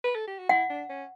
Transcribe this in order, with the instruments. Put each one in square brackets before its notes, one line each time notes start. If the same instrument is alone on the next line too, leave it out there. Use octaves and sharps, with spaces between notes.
[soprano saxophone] B4
A4
G4
F#4
[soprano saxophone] E4 [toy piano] F#5
[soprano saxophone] D4
C#4